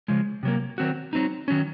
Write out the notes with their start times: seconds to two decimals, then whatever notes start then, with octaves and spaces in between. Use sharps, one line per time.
0.08 C#3 F3 G#3
0.43 C3 F#3 A#3
0.78 D#3 F#3 C4 F#4
1.13 F#3 C4 D#4
1.48 D#3 F#3 C#4